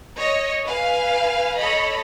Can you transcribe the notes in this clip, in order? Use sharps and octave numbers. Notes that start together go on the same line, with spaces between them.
C#5 D#5
B4 F5 G#5
A4 C#5 D#5 B5